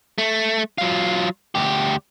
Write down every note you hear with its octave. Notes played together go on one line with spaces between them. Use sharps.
A3
F#3 F4
D2 G4